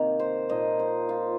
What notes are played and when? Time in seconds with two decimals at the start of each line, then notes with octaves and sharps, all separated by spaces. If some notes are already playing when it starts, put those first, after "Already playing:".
Already playing: C3 D#3 A#3 D#4 A#5
0.19 C5
0.49 A#2 F3 A#3 D#4 D#5
0.79 C5
1.09 F4